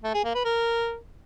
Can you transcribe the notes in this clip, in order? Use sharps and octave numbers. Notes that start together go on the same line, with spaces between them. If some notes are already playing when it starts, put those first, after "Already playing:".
A3
G#4
A#3
B4
A#4